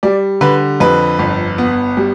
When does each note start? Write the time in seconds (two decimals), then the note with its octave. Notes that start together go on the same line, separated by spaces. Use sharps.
0.03 G3 D5
0.41 D3 B4
0.80 F2 B4
1.19 G1
1.58 B3
1.97 G3